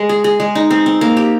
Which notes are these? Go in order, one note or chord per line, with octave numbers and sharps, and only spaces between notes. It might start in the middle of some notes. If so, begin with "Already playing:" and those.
Already playing: G#3
G#4
G#4
G#3
D#4
C4
C4
A#3
G4